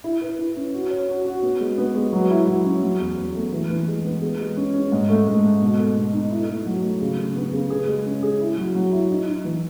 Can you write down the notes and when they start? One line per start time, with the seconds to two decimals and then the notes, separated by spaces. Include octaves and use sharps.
0.04 E4
0.21 B4
0.38 E4
0.56 C#4
0.74 F#4
0.91 C#5
1.08 F#4
1.26 F#4
1.43 B3
1.60 G#3
1.78 B3
1.95 G#3
2.13 F#3
2.30 E4
2.47 F#3
2.65 C#4
2.83 F#3
3.00 E2
3.17 E2
3.35 A3
3.53 E3
3.70 E3
3.87 G#3
4.05 B3
4.21 G#4
4.40 G#3
4.57 C#4
4.74 C#4
4.92 G#2
5.09 A3
5.27 G#2
5.44 A3
5.62 B2
5.79 A4
5.97 B2
6.13 D#4
6.31 E4
6.48 A3
6.66 F#3
6.84 A3
7.01 C#3
7.18 C#3
7.36 B3
7.53 C#3
7.70 G#4
7.88 G#3
8.06 C#4
8.23 G#4
8.41 E4
8.58 F#3
8.75 F#3
8.92 E4
9.11 D#4
9.27 D#4
9.45 E3